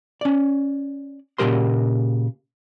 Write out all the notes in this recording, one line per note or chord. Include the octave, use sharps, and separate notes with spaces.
C#4 D5
A#2 C#3 E3 G4 A#4 C6